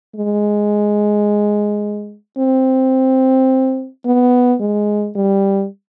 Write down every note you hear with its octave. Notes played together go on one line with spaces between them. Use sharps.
G#3
C4
B3
G#3
G3